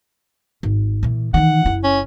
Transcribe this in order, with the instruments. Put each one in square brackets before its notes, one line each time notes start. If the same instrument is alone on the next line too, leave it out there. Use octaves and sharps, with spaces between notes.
[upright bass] G#1
A#2 E3
[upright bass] D#3 E3 [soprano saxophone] F#5
[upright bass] F#1 E4
[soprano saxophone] C#4